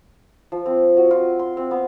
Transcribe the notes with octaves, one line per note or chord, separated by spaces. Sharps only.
F3
C4
F#4
F4
C6
C4
B3